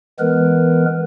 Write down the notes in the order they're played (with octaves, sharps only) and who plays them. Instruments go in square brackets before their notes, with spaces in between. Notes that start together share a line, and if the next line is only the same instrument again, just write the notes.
[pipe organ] E3 G#3 B3 A#4 B4